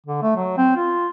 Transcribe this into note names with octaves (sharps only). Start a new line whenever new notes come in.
D3
A3
F#3
C4
F4